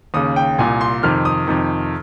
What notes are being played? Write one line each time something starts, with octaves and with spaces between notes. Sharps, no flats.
D#2 C#3 D#6
G5
C2 A#2 G#5
C6
F2 C3 D#3 F6
D#6
F2 C3 D#3